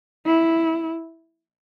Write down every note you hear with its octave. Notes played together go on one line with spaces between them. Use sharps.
E4